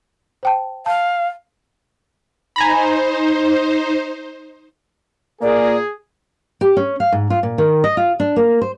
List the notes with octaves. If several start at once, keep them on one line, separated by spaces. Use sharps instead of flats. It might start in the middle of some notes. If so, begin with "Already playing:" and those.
C5 G5 A5
F5 A5
D#4 C5 G#5 A#5 B5
A#2 A#3 G#4 D5
G4
C#4
F5
G#2
F4
A#2
D#3
D#5
F4
D4
A#3
C5